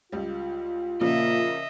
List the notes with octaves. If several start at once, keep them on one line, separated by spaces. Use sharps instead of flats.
C#2 G3 F4
A#2 C#3 F3 A#3 D#5 E5